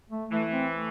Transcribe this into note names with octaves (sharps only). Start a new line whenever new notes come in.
A3
E3 A3
C4
A3